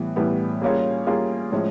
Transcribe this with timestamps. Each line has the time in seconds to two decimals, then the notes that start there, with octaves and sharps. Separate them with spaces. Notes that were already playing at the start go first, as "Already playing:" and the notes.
Already playing: A2 E3 G3 B3
0.16 A2 E3 G3 B3
0.62 G3 A#3 C#4 F4 G#4
1.07 G3 A#3 C#4 F4 G#4
1.52 A2 F3 G#3 C#4